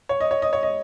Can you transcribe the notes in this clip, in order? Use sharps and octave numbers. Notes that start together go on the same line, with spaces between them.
C#5
D#5
C#5
D#5
C#5
D#5